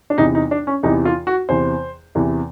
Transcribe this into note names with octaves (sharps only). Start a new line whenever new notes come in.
D4
E2 C3 E3 D#4
D#4
D4
C#4
E2 C3 E3 D#4
F4
F#4
E2 C3 E3 C5
E2 C3 E3